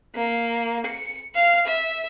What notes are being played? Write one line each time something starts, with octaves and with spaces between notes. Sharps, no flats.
A#3
C#7
F5 F6
E5